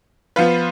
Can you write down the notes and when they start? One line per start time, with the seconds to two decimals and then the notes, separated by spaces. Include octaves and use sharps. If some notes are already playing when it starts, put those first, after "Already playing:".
0.36 F3 B3 F4 B4